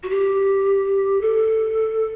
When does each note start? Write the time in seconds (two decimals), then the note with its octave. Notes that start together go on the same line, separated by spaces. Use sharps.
0.03 F#4
0.10 G4
1.21 A4